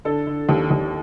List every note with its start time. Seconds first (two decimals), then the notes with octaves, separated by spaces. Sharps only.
0.05 D3 A4
0.27 D3
0.49 D#2
0.70 D#2